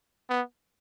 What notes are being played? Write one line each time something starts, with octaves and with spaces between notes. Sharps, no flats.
B3